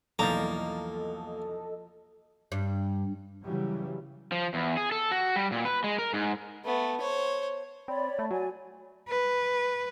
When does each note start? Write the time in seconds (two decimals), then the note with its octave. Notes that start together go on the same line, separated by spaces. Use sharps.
0.19 B1 E2 F3 A#3 A4 D5 D#5 A#5
2.52 G2
3.44 C#3 E3 F#3 G3
4.32 F3
4.54 E2
4.77 G#4
4.92 A4
5.11 F#4
5.36 G3
5.52 A#2
5.65 B4
5.84 G#3
5.99 A#4
6.14 G#2
6.65 A3 B3
7.01 C5 C#5
7.88 C4 C#5 D5 B5
8.19 A3
8.31 F#3 D5 G#5
9.09 B4